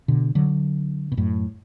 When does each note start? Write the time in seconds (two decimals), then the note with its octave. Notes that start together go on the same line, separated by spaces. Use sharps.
0.08 B2 D3
0.35 D3 F#3
1.12 B2
1.17 F#2 A2